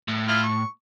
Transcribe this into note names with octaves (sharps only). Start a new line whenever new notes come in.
A2
E4 F4 F6
C#6